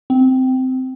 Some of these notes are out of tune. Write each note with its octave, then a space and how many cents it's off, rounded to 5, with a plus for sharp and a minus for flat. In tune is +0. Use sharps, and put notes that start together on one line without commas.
C4 -15